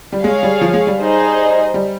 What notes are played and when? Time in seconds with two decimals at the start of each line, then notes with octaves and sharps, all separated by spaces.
0.13 G3
0.23 G#3 G#4 C#5 F5
0.43 G3
0.61 F3
0.74 G#3
0.87 G3
1.00 D#4 G#4 C5 D#5
1.74 G3